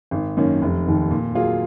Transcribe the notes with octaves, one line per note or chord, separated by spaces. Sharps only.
G#1
F#2 D#3 A#3 C#4
F1
D#2 D#3
A#2
F#3 A#3 F4 G#4